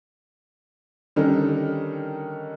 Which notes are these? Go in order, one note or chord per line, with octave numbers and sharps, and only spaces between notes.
D3 D#3 G3 C#4 D#4 A#4